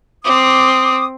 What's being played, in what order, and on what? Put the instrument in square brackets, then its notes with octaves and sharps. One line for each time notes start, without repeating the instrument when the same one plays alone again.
[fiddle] C4 [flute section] D6 D#6